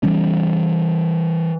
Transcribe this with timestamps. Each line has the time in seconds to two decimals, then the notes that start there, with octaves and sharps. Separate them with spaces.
0.03 E3 G3 C#4